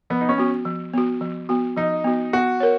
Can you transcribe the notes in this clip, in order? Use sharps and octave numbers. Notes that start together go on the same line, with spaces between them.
F3 B3
D#4
C#4
B3 F#4
F3
B3 F#4
F3
B3 F#4
F3 D#4
B3 F#4
B3 F#4
A#4 C#5